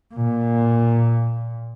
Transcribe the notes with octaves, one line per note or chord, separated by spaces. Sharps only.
A#2